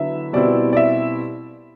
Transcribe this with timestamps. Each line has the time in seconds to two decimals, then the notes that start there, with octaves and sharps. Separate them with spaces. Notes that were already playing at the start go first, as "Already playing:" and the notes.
Already playing: D3 F#3 B3 E4 E5
0.33 B2 G3 C4 E4 D5
0.73 D5
0.77 E5